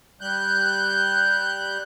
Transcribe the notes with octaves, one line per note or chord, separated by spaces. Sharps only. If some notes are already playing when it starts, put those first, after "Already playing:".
G3 F#6 G6